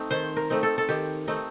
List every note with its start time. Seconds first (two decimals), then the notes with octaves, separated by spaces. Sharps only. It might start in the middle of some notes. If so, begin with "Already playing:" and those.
Already playing: A3 C4 D#4
0.11 D#3 C5
0.37 A#4
0.50 A3 C4 D#4
0.63 A4
0.78 A4
0.89 D#3 G4
1.28 A3 C4 D#4